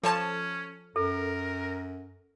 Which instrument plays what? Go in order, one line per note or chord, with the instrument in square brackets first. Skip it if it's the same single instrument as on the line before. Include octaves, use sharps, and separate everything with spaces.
[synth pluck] F3 C#5 A5 [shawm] C#4 [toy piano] A4
[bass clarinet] F#2 [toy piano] A4 [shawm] A#4